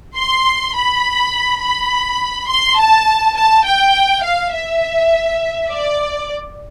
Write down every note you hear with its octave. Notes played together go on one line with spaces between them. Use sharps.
C6
B5
B5
C6
A5
A5
G5
F5
E5
D5